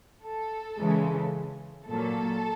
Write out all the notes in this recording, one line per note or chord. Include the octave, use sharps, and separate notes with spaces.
A4
C#3 E3 G#3
A#2 F#3 A#3 A4